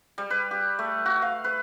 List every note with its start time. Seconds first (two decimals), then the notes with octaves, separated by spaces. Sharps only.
0.18 G3
0.30 B4
0.51 G4
0.79 A3
1.06 F#4
1.22 F5
1.44 B4